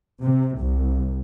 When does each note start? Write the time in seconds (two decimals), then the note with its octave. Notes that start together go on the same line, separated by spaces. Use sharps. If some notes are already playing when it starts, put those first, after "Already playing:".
0.20 C3
0.58 C2